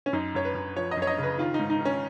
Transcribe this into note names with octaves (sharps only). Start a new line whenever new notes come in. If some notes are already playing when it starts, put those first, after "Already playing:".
C#4
F#2 D#4
F#2 C#5
B4
F#2
F3 C#5
D#5
F#2
C#5
D#5
C#3
B4
D#3 F4
D#4
G#2
D#4
D#3 C#4